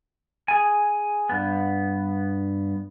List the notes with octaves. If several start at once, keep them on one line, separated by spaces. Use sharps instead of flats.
G#4 G#5
G2 B3